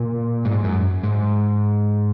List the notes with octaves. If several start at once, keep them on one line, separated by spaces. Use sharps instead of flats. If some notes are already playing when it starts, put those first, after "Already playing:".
Already playing: A#2
G#2
F#2
G#2